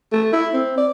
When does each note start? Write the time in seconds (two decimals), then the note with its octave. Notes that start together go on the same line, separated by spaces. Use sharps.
0.12 A3
0.33 E4
0.53 C4
0.77 D5